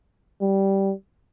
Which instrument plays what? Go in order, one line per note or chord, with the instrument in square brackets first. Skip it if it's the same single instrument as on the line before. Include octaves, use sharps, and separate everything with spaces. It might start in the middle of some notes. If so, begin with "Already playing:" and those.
[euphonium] G3